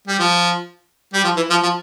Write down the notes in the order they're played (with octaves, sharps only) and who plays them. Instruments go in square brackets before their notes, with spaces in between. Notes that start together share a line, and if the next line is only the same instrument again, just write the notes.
[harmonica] G3
F3
G3
F3
E3
F3
F3